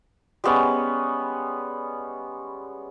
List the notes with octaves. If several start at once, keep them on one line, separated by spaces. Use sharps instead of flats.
G3 G#3 B3 C#4